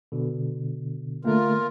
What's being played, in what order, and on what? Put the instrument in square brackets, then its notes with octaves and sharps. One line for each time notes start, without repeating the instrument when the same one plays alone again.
[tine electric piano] B2 D3
[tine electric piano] D3 A3 A#3 [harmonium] F4 A#4